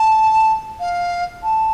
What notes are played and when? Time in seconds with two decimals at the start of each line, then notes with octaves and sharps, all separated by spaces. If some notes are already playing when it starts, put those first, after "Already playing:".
Already playing: A5
0.80 F5
1.43 A5